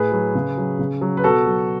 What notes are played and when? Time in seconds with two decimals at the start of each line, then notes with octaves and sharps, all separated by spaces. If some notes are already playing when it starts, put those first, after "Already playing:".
Already playing: A2 G#4 B4
0.12 F#3
0.35 C#3
0.58 F#3
0.79 C#3
1.01 F#3
1.17 B4
1.24 B2 F#4 A4
1.46 F#3